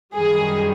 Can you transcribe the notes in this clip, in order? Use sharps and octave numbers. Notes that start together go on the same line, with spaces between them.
F#2 D#3 G3 G#4